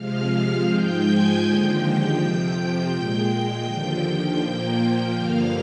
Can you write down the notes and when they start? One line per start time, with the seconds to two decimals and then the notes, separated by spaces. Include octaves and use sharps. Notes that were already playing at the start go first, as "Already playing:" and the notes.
Already playing: C3 F3 G#3 F5 F6
0.67 G#2 F3 G#3 G5 G6
1.04 G#5 G#6
1.41 D#2 D3 F3 G#3 G5 G6
2.16 F2 C3 F3
2.90 A#2 G#3
3.65 D#2 D3 F3 G5 G6
4.02 G5 G6
4.40 A#2 F3 A#3
5.14 G2 D3 F3 A#3 F5 F6